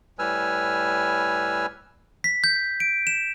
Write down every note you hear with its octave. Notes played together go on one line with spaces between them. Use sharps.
A2 G3 B4 G#5 E6 F6
B6
G6
D7
E7